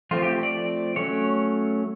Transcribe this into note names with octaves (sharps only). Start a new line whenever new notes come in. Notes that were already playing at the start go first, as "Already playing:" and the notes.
F3 A3 C4 F4
G4
D5
F#3 A3 C#4 C#5